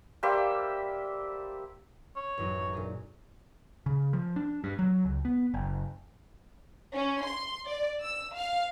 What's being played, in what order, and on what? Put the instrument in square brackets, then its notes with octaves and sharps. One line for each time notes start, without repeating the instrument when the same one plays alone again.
[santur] G3 A#3 C5 E5
[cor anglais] C#5
[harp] A1 F#2 D#4
A#2 D4 G#4
[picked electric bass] C#3
F3
D4
G2
F#3
C#2
B3
F#1
[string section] C#4
C6
D5
E6
F5